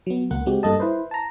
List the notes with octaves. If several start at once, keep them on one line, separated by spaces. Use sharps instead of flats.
F#3 B3
C#2 A#3 F#5
G#3 C4 F#4 G4
G2 A#3 A4 D#5 A5
E4 B4 C5
A5 A#5